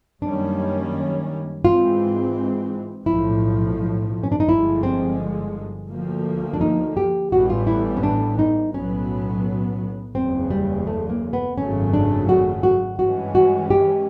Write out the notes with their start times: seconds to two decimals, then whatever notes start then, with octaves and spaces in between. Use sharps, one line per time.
0.22 F#2 D#3 G3 A#3 C#4 D4
1.64 G#2 E3 G#3 C4 F4
3.06 B1 A2 F3 E4
4.23 C#4
4.32 D4
4.40 D#4
4.48 G1 G2 D3 F3 G#3 E4
4.83 C4
5.90 D2 D3 F3 A#3
6.53 D4
6.61 D#4
6.97 G4
7.32 A1 A2 E3 G3 B3 F#4
7.50 F4
7.67 E4
7.97 C#4
8.03 D4
8.39 D#4
8.74 B1 A2 F#3 B3 C#4
10.15 F#1 E2 C#3 C4
10.50 G3
10.87 A3
11.10 A#3
11.33 B3
11.58 G#1 F#2 C#3 F#3 A3 C#4
11.94 D4
12.29 F#4
12.63 F#4
12.99 G2 E3 G#3 C#4 F#4
13.35 F#4
13.70 G4